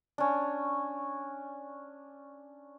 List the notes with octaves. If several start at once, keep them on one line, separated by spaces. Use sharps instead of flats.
C#4 D4